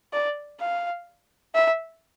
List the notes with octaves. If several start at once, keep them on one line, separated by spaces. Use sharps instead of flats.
D5
F5
E5